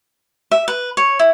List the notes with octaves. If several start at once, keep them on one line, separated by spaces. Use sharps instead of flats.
E5
B4
C#5
E4